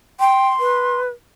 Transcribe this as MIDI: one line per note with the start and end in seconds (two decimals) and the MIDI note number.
0.20 0.48 79
0.20 1.00 84
0.60 1.09 71